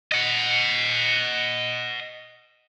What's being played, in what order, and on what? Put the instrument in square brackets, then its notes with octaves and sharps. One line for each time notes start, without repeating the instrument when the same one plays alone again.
[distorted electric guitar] D#5 F#5